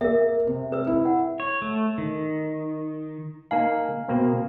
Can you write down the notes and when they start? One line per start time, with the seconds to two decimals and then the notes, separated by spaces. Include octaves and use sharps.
0.01 A#3 A#4 E5
0.47 C3
0.72 B4 E6
0.87 E4
1.05 F#5
1.40 C#5
1.62 A3
1.98 D#3
3.51 A#3 D#4 F5 G#5
4.08 B2 A#3 C4